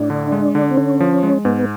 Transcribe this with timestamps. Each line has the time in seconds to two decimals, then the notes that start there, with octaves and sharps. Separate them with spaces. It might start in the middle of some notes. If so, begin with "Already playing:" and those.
Already playing: A2 D4
0.10 D3
0.32 G#3
0.55 D3
0.71 C4
0.77 D3 C#4
1.00 F3
1.23 G#3
1.45 G#2 B3